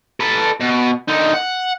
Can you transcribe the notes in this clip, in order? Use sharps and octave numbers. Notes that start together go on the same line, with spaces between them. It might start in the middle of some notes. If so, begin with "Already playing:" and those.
A4 B4
B2
D3 D#4
F#5